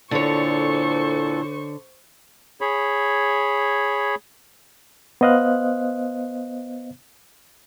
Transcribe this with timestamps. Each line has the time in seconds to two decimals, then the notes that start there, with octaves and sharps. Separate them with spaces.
0.11 A#2 D3 D4 E4 A4 C5 C#5 C#6
2.61 G#4 C#5 B5
5.21 B3 C5 D#5 F5 F#6